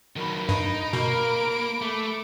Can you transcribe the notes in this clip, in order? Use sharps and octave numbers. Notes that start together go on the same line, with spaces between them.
D#3 F#3 A#4 B5
G2 D#4 B5 D7
B2 A#3 A#4
A3 D6